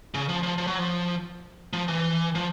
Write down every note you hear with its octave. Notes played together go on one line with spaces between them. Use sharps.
C#3
F3
F3
F3
F#3
F3
F3
E3
F3